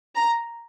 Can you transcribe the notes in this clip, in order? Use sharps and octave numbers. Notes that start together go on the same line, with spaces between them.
A#5